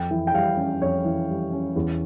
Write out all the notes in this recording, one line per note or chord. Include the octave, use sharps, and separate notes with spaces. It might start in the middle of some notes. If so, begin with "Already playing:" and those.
Already playing: F2 G5
E3
G5
G3 F5
C#4
F2 C#5
E3
G3
C#4
E2